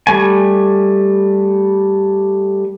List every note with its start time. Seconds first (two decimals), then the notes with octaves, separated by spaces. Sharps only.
0.07 G3 A3 G#5